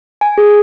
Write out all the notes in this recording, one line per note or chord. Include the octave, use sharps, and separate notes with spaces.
G#5
G#4